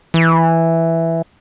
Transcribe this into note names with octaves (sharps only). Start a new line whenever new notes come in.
E3